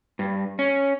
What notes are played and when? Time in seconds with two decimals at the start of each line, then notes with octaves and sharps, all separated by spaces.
0.19 G2
0.59 C#4